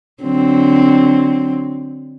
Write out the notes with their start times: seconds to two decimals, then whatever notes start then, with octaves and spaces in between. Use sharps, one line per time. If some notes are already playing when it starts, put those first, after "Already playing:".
0.23 D3 F#3 C4